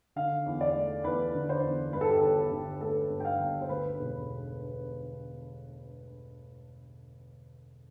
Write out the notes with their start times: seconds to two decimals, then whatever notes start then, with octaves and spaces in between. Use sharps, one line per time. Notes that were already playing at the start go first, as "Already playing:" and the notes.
0.16 D3 F5
0.46 E2
0.61 D5
0.75 A3
1.04 E2 B4
1.34 D3
1.49 C5
1.63 E2
1.93 G2 B4
2.01 A4
2.09 G4
2.17 A4
2.22 G1
2.37 G4
2.51 D3
2.81 A3 A4
3.10 G2
3.20 G5
3.25 F5
3.40 G1
3.61 C5
3.69 D2 B4
3.99 E1